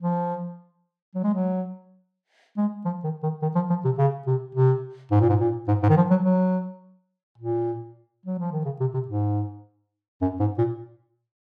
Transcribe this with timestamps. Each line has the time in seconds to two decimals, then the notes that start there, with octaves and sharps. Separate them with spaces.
0.02 F3
1.15 F#3
1.24 G#3
1.34 F#3
2.57 G#3
2.85 F3
3.04 D#3
3.23 D#3
3.42 D#3
3.55 F3
3.70 F3
3.84 C3
3.98 C#3
4.27 C3
4.55 C3
5.11 G#2
5.21 A#2
5.29 G#2
5.40 A#2
5.68 G#2
5.83 G#2
5.90 D#3
5.97 F3
6.10 F#3
6.25 F#3
7.38 A#2
8.26 F#3
8.39 F3
8.52 D#3
8.65 C#3
8.80 C3
8.94 C3
9.08 G#2
10.22 F#2
10.40 G#2
10.58 A#2